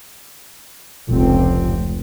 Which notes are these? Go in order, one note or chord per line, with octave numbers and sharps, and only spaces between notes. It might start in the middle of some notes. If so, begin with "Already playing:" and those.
F1 C#2 C4